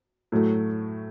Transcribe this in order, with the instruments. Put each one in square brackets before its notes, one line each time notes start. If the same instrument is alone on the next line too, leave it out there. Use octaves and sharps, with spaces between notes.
[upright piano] A2 F#3 A3